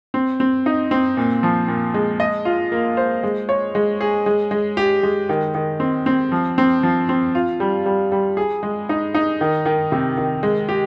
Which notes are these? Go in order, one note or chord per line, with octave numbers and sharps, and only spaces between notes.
C4
C4
D#4
C4
A#2
F3
A#2
G#3
D#5
F4
A#3
C5
G#3
C#5
G#3
G#4
G#3
G#3
G4
G#3
D#3
D#3
C4
C4
F3
C4
F3
C4
F4
G3
G3
G3
G#4
G#3
D#4
D#4
D#3
D#3
C3
D#3
G#3
G4